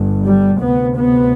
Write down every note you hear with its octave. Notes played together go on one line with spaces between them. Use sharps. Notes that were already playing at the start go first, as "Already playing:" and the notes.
Already playing: G1 G2
G3
D2 C3 B3
B3